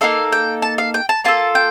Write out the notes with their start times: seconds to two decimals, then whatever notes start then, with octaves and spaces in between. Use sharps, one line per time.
0.01 A#3 D#4 A4 F5
0.32 G5
0.62 A5
0.78 F5
0.94 G5
1.09 A5
1.24 A#3 F4 A4 A5
1.55 G5